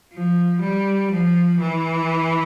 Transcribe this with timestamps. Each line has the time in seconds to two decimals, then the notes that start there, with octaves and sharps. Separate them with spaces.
0.14 F3
0.62 G3
1.11 F3
1.60 E3